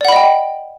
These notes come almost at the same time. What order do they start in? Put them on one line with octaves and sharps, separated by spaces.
D5 F#5 B5 D#5 G5